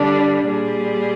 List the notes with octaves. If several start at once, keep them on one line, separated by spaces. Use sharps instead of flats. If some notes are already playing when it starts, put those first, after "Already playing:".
Already playing: D3 G3 D4
A#2 G3 G#4